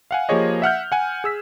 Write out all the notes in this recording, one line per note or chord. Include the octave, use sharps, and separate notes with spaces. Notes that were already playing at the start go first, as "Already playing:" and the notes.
F5 F#5 G#5
F3 A#3 G4 G#4 C#5 D#5
E5 F#5 F6 G6
F#5 G#5
G#4 E6 B6